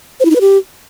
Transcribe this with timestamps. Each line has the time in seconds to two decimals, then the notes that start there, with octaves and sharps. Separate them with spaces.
0.20 C5
0.25 E4
0.30 D#4
0.36 B4
0.41 G4